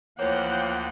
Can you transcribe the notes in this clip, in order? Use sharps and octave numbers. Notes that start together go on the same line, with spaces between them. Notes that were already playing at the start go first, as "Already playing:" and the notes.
D2 E3 F3 A#3 C#5 F#5 G5 G6